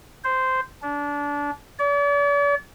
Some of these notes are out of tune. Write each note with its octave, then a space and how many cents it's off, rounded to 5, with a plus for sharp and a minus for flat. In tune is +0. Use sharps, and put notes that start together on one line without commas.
C5 -10
D4 -25
D5 -45